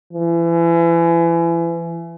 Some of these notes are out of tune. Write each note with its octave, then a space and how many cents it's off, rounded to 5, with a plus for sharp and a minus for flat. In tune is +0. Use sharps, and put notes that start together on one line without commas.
E3 +30